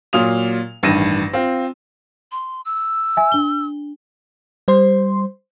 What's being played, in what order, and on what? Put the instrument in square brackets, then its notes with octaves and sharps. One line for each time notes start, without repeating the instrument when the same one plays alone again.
[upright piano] A#2 F#3 F4 F5 D#6 F7
A1 G2 D#3 A#6 D#7 E7
C4 F4
[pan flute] C6
E6
[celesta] E5 G#5
D4 G7
[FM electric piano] G3 C5 C6